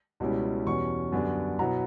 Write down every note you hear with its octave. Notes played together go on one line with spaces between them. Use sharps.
C#2 B2 G3 C#4 E4
E2 B2 G3 C#4 C#6
F#2 D3 G3 B3 D4
B2 F#3 B3 E4 A#5